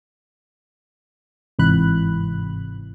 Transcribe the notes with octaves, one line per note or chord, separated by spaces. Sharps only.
G1 G#2 C3 E3 B5 F#6